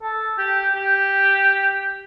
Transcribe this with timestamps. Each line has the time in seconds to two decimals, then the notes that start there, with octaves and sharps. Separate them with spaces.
0.02 A4
0.38 G4
0.75 G4